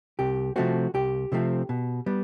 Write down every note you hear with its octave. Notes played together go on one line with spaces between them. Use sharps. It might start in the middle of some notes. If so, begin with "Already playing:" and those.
C2 G4
C3 F3 A3 C4 F#4
C2 G4
C3 F3 A3 C4
B2
G3 B3